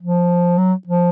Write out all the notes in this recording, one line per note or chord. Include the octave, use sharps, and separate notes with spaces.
F3
F#3
F3